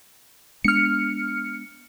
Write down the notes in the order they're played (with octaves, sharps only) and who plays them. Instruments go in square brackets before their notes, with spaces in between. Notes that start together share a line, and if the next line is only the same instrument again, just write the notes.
[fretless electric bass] G#3 B3 D4 [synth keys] F6 C#7